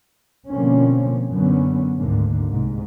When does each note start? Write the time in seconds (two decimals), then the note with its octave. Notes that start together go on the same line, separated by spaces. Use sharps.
0.53 B2 D3 F3 A#3 C4 C#4
1.33 F#2 D3 B3 C#4
2.01 G#1 D2 G#2 D3 A#3
2.50 C2 G#2